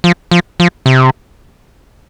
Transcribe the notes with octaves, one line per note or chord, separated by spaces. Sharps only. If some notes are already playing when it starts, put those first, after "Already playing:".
F3
F3
F3
C3